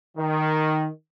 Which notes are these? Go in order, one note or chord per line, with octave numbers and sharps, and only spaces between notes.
D#3